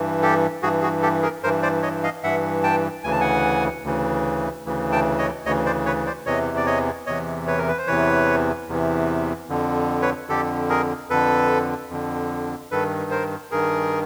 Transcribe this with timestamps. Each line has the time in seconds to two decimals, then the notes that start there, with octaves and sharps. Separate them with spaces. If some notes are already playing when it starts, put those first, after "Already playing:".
Already playing: G2 E3
0.22 G4 A4
0.63 G2 E3 F#4 G#4
0.82 F#4 G#4
1.02 G4 A4
1.22 G#4 A#4
1.43 G2 A#4 C5
1.47 E3
1.62 C5 D5
1.83 C#5 D#5
2.04 D#5 F5
2.23 G2 E3 E5 F#5
2.63 G5 A5
3.04 D2 C#3 E3 G#5
3.12 A5
3.21 F#5 G#5
3.84 D2 C#3 E3
4.66 D2 C#3 E3
4.92 G5 A5
5.18 C#5 D#5
5.45 D2 C#3 E3 C#5 D#5
5.66 C5 D5
5.86 B4 C#5
6.06 C5 D5
6.26 E2 C3 E3 C#5 D#5
6.57 D5
6.66 C#5 D#5
7.07 E2 C3 E3 C#5 D#5
7.47 B4 C#5
7.58 A#4
7.68 B4
7.78 C5
7.87 E2 C3 E3 B4 C#5
8.68 E2 C3 E3
9.49 F2 D3
10.02 B4 C#5
10.29 F2 D3 G4 A4
10.70 G#4 A#4
11.10 F2 D3 A4 B4
11.90 F2 D3
12.71 G2 D#3 A4 B4
13.11 A#4 C5
13.51 G2 D#3 G#4 A#4